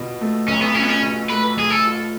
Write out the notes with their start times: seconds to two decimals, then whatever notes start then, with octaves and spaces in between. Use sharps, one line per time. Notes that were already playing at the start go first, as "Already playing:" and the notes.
Already playing: B2 F4
0.21 A3
0.48 B1 C#4
0.62 B3
0.75 C#4 F4
0.83 B3
0.89 C#4
1.02 B2
1.30 A3 B4
1.56 B1 G#4
1.70 A4
1.85 F4